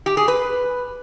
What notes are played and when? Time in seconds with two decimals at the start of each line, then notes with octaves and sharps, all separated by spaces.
0.06 G4
0.17 G#4
0.28 B4